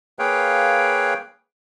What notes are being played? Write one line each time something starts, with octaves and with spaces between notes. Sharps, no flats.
A#3 G#4 B4 C#5 F5 G5